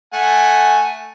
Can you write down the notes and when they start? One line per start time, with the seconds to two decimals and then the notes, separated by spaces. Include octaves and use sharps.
0.13 A3 F#5 G#5